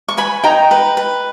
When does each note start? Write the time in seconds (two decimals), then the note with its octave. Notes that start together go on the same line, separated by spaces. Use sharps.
0.08 C#6
0.17 B4 G#5 B5
0.44 D#4 G5 A#5
0.71 B4
0.97 B4